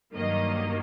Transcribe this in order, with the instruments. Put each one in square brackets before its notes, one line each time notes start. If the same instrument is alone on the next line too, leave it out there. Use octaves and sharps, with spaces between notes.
[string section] G2 D#3 F#3 A#3 D#5